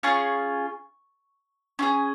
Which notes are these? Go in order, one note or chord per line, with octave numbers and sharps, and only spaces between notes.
C#4 F4 G#4 C#6
C#4 F4 G#4